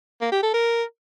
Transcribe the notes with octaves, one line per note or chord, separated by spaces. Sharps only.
A#3
G4
A4
A#4